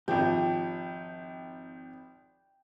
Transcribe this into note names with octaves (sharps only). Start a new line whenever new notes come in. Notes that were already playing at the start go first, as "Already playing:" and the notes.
G#1 F3 G4 G5